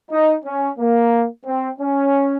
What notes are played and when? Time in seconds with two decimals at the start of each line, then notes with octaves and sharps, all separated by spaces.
0.11 D#4
0.45 C#4
0.78 A#3
1.46 C4
1.79 C#4